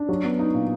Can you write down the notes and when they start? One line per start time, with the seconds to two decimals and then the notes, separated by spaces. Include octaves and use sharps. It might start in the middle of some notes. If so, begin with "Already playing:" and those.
Already playing: D4
0.09 F#3
0.24 B3
0.39 D#4
0.54 A#2